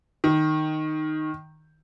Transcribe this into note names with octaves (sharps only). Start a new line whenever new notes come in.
D#3